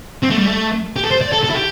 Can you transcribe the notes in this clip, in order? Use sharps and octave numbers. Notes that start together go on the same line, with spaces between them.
C4
A3
G3
A3
G4
A4
C5
D5
A4
A4
E4
G4